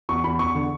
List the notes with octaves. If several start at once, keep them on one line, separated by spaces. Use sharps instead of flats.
E2 C#6
E2 B5
E2 C#6
D3